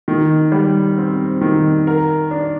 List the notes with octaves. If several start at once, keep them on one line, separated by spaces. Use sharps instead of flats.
D#3
G3
C4
D#3
A#4
D4